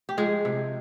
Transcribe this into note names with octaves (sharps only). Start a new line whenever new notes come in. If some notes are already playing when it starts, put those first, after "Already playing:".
G4
F3 G#3 G#4
C3